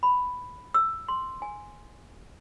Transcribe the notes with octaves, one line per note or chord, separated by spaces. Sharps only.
B5
E6
C6
G#5